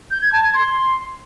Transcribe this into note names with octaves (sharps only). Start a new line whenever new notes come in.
G6
G#6
A5
G#6
C6